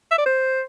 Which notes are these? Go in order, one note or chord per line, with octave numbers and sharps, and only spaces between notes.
E5
D5
C5